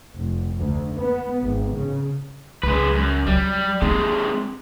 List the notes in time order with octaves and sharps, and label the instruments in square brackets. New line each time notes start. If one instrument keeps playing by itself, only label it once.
[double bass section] F1
D2
B3
G#1
C#3
[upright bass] C#2 [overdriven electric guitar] G#3 B4
[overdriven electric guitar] F#2
[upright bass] F#3 [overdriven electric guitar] G3
[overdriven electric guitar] C3 G#3 [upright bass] A#3 D#4